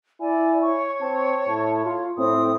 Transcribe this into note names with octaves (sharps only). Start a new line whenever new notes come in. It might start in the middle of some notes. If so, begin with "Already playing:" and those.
E4 D5 G#5
C#5 C#6
C4 A5
A2
F4
A2 C4 D#6